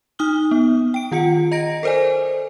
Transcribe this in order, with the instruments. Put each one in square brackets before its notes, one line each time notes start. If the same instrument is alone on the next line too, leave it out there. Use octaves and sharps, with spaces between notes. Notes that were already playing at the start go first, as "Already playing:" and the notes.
[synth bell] D#4 D#6 F6 G7
B3
G5 D7
D#3 F4 F#5 C#7
D#5 A#5 A#6 D7
A4 A#4 C5 D5 G#5